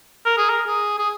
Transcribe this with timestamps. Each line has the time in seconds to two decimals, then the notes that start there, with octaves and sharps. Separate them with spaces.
0.25 A#4
0.37 G#4
0.49 A#4
0.67 G#4
0.98 G#4